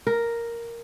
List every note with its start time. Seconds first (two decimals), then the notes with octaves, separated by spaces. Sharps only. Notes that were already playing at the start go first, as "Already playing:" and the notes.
0.07 A#4